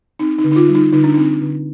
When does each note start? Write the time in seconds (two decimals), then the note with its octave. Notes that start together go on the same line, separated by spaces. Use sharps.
0.19 C4 D#4
0.38 D#4
0.44 D3
0.52 D#4
0.56 F4
0.68 G3
0.75 D#4
0.93 D3 D#4
1.04 D4
1.14 C4 D#4
1.41 D3